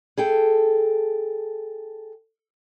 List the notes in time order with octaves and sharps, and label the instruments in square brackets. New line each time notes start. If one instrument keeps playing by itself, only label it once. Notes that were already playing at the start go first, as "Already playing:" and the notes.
[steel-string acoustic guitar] G#4 A4 G5